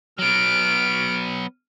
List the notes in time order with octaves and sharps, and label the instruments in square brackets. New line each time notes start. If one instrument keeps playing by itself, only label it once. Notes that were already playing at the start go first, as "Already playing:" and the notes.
[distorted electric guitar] F#3 B3 [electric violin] F6 D7